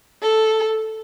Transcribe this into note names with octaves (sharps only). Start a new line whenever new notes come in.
A4